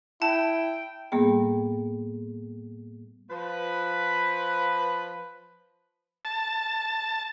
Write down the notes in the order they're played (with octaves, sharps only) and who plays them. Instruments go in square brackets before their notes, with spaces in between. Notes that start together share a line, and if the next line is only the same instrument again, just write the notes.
[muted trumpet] E4 [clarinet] G5 [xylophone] A5
[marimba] A2 G3 A#3 B3 G#4 G5
[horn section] F3 B4
[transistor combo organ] A5